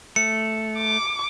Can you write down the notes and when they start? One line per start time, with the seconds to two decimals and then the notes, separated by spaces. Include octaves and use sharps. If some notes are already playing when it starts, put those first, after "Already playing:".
0.16 A3 C#7
0.77 D6